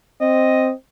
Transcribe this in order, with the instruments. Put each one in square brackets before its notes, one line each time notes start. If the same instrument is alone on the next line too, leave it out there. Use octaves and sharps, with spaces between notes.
[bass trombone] C4 [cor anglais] D#5